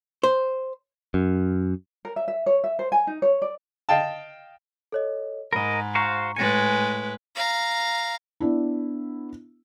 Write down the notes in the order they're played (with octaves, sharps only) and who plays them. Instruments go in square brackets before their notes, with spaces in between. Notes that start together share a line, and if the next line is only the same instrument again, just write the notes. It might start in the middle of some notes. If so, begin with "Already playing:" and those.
[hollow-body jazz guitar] C5
[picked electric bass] F#2
[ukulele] A#4
E5
E5
C#5
E5
C5
G#5
D#4
C#5
D5
[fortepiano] D#5 F5 G5 A5
[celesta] A4 C#5 D#5
[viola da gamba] G#2 [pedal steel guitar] A#4 D#5 [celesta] B5
[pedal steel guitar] F#4 C5 F5 [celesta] A#5 C#6
[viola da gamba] A2 G#3 B4 [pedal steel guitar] G#5 [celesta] A6 A#6 C#7
[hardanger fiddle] F5 A#5
[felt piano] B3 D4 E4